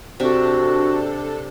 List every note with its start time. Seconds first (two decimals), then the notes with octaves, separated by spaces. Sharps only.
0.20 C3 D4 F#4 A4 E5